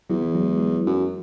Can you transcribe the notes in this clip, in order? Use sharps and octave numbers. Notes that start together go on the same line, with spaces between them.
E2 F#3
E3
F#3
G#3
F#3
G#3
F#3
F#2